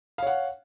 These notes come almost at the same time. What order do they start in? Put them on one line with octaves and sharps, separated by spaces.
F5 C#5 F#5